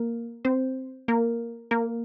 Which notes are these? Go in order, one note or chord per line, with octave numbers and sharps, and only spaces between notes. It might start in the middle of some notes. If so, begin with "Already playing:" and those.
Already playing: A#3 A#4
C4 C5
A#3 A#4
A#3 A#4